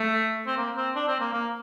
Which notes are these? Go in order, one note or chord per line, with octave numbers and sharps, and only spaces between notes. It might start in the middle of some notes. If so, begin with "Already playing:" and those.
Already playing: A3
C4
A#3
C4
D4
C4
A#3
A#3